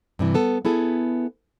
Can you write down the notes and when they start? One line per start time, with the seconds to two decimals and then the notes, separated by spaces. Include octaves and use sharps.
0.19 G2 C3 E3
0.35 B3 A4
0.65 B3 E4 G#4 A4